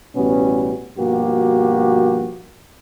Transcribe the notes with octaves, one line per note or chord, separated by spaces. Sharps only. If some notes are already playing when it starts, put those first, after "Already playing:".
A1 B2 G3 B3 C#4
G2 B2 F3 A#3 F#4 G4